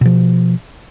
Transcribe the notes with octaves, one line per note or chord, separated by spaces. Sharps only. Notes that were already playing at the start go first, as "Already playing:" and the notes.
B2 F3